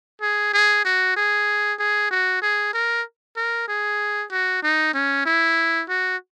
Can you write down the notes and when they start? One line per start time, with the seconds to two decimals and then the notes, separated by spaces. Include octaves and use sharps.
0.22 G#4
0.54 G#4
0.85 F#4
1.17 G#4
1.79 G#4
2.11 F#4
2.42 G#4
2.74 A#4
3.37 A#4
3.68 G#4
4.31 F#4
4.63 D#4
4.94 C#4
5.26 E4
5.89 F#4